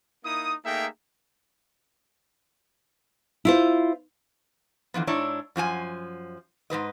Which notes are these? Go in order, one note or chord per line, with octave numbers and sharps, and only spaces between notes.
A#3 D#4 E4 D#6
A3 A#3 D#4 G#4 E5 G5
E4 F4 C5
D3 E3 F3 B3
G#2 D4 E4 C#5 E5 A#5
F#2 F3 F4 G#5
G#2 E3 B4 D#5